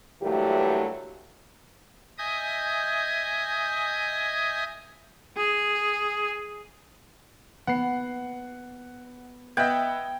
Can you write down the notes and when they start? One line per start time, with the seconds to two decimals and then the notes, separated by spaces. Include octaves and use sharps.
0.22 G2 A#2 E3 F#3 A3 G4
2.18 D#5 E5 G#5 D#6 G6 G#6
5.37 G#4
7.67 B3 F#5 C7
9.57 B3 D#5 E5 G5 F#6 G#6